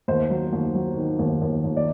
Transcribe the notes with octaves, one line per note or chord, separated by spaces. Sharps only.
D#2 C5
F#3
D#2
F#3
D#3
D#2
D#2
D#2
D5